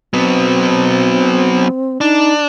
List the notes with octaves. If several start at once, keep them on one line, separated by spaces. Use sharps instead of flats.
F#3 B3 C4
D4 D#4